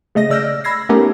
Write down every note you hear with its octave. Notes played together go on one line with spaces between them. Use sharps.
C#3 A3 D#5 A#6
C#3 D5 E6 F6 G6 A#6
B5 E6 G#6 A#6 C7
A3 B3 C#4 D#4 G4 A#4